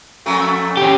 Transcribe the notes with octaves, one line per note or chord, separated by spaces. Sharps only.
F2 F#3 A3
C#4 G4